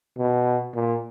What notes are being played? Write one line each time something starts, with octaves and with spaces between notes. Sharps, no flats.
B2
A#2